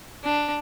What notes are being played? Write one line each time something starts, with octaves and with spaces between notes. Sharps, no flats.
D4